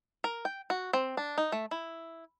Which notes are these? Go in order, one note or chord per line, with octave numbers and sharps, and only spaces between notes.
A#4
G5
F#4
C4
D4
D#4
A3
E4